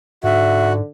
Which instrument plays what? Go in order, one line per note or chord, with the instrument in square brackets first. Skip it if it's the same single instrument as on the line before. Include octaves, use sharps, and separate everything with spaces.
[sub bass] G#2 [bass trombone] D3 [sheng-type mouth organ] F#4 [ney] E5